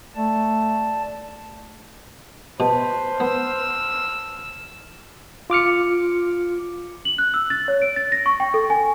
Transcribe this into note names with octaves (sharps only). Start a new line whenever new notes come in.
A3 D5 A5
B2 B4 C5 A5
B3 E6 F6
F4 D6 F6 C#7
F#7
F#6
E6
A6
C#5
D7
A6
A#6
C#6
G5
A4
G#5